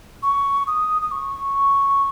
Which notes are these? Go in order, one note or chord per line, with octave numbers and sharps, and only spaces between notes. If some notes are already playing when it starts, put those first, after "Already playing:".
C#6
D#6
D#6
C#6